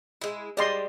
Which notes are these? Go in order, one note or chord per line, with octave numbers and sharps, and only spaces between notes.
G#3 E4
G3 G#3 D5 D#5 C6